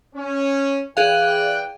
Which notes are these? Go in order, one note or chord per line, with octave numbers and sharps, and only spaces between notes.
C#4
E3 G#4 D5 F5 G5 F#6